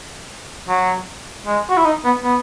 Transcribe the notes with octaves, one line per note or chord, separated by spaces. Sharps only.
F#3
G#3
F#4
E4
D#4
B3
B3